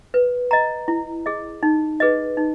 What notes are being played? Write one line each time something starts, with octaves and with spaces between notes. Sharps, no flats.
B4
D#5 A#5
E4
G#4 D#5
D#4
G#4 B4 D#5
D#4